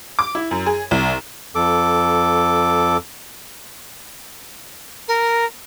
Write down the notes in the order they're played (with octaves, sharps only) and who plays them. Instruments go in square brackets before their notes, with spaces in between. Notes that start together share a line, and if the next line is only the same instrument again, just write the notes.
[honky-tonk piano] D6
E4
F#2
G#4
C2
[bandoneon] F2 A4 D6
[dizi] A#4